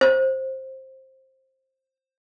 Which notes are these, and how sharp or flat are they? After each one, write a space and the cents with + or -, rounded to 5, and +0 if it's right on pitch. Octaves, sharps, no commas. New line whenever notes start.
C5 +15